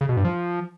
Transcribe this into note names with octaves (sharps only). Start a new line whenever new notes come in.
C#3
B2
G2
F3